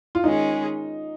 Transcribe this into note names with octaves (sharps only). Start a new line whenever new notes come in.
F4
D#3 G#3 C#4 D#4 G#4